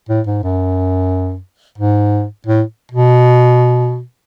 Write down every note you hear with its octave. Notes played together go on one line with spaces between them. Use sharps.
A2
G#2
F#2
G#2
A2
B2